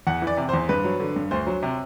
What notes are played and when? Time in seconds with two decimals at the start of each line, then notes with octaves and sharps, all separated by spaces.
0.07 E2 F#5
0.22 E3
0.27 D5
0.37 C3
0.49 E2 C5
0.69 G2 B4
0.84 F#3
1.00 D3
1.16 G2
1.31 D2 C5
1.47 F#3
1.63 C3